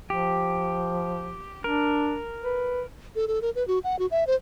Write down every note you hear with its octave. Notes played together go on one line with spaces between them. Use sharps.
F3 G4
D4 A#4
B4
A4
A4
A#4
B4
F#4
F#5
F#4
E5
C5